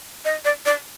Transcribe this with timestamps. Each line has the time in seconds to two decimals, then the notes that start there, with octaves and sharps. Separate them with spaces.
0.25 D#5
0.45 D5
0.66 D5